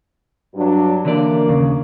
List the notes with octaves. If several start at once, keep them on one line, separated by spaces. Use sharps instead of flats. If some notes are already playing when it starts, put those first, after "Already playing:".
G2 F#3 D4
D3 E3 A#3 D5
D#2 C#3